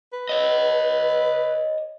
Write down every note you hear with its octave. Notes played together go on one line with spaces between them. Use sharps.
B4
C#5 D#5